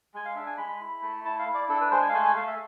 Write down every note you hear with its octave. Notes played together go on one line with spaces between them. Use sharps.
G#3 G#5
F5
D4 E5
G#5
G#3 B5
B5
E4
A3
E4 A5
F5
E4
D5
D4 A4
B4
G#3 C5
G#5
F5
A3 G#5
G#5
A3 F5
E5